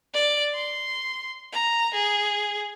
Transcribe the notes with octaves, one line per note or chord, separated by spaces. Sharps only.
D5
C6
A#5
G#4